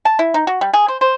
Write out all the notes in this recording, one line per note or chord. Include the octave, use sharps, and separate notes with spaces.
A5
E4
D#4
F#4
G3
G#4
C5
C5